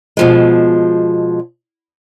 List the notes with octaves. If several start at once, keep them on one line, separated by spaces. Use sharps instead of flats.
B2 F3 G#3